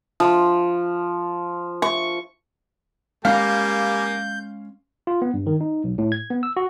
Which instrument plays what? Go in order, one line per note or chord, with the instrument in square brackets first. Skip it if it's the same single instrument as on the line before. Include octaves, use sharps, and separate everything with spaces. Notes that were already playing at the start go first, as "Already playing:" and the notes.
[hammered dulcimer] F3
C#6
[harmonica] G3 A#3 G#5 [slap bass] G#3 C#4 [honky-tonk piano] F5 [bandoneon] G6
[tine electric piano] F4
B3
G2
D#3
D#4
B1
A2
G#6
B3
E6
F#4